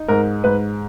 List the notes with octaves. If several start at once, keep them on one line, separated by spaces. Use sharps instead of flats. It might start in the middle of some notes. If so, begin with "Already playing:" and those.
Already playing: D#4
G#2 A#4
G#2 B4